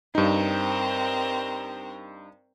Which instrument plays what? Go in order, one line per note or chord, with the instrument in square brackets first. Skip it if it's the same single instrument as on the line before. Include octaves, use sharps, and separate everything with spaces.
[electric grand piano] G2 D#4 [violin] C4 A#4